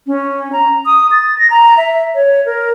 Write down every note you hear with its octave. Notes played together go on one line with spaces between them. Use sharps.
C#4
A#5
D#6
A6
A#6
A#5
E5
C#5
A#4